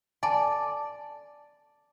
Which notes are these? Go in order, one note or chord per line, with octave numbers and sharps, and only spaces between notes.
D5 G#5 A5